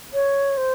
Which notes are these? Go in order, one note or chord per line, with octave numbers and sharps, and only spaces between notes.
C#5
C5